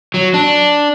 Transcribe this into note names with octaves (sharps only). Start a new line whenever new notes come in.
F#3
D4